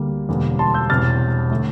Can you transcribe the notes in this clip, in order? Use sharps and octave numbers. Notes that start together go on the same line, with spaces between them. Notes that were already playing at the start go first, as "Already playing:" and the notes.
Already playing: D2 D3 G3 A#3
E1 E2 D3 G3 A#3
A5 C6
E6 G6
E1 E2 C3 F6 A6
D3 A3